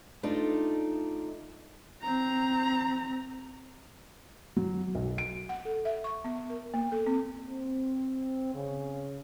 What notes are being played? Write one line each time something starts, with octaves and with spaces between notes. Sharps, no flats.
A3 D4 D#4 F4
C4 A#5
F#3
B1
D7
F#5
A4
E5
C#6
B3
A#4
A#3
A4
C4
C4
C#3